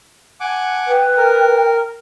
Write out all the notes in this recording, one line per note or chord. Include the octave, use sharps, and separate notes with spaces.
F#5 G#5 A5 D6
B4 G5
A#4